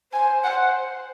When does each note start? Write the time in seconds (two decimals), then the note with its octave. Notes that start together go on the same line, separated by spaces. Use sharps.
0.12 C5 G#5
0.44 F#5